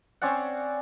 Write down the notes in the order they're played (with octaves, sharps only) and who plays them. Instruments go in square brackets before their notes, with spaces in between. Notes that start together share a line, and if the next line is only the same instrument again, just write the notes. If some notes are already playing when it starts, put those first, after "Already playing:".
[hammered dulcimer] C4 C#4 D5 F#5